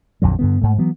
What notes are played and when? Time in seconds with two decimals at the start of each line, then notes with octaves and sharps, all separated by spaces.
0.22 A#1 F2 D3 F#3
0.39 G2 D3 B3
0.62 G#2 A3
0.78 E3 F#3 B3